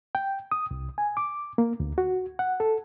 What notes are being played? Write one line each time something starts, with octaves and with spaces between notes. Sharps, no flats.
G5
D#6
C2
G#5
D6
A#3
D2
F#4
F#5
A4